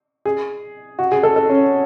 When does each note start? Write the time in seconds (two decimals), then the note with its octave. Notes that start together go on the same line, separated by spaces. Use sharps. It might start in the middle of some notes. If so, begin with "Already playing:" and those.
0.25 G#4
0.99 F#4
1.12 G#4
1.23 A4
1.36 A4
1.49 C#4